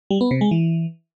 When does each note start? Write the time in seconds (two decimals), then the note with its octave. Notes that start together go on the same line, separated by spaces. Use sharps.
0.10 G3
0.21 B3
0.31 C3
0.41 G#3
0.51 E3